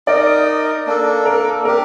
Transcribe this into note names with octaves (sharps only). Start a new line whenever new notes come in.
D#4 A#4 D5 D#5
A#3 D4 A4
A#4
D4 G4 A#4